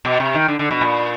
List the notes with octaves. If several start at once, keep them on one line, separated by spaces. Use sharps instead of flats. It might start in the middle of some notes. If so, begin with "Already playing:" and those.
B2
C3
D#3
D3
D3
B2
A#2